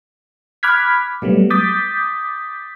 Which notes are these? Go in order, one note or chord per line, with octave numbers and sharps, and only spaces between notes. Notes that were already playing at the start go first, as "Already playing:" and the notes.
B5 D6 F6 F#6 G#6 B6
F#3 G3 A3 B3
D6 D#6 G6 A6 B6